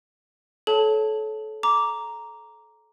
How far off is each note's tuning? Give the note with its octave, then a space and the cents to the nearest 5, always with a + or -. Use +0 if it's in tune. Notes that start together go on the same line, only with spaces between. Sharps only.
A4 -30 C#5 +0 A5 +0
A#5 +0 D6 -10